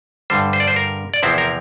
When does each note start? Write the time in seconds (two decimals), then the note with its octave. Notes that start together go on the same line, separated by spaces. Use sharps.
0.30 G2 D3 G3 C5
0.53 C5
0.60 D5
0.68 C5
0.76 A#4
1.14 D5
1.23 E2 C3 F3 C4 E4 C5
1.38 A#4